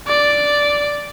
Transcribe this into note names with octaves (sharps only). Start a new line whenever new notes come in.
D5